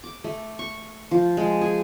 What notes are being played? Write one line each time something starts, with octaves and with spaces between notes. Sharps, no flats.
D6
A3
C#6
F3
G#3
G#4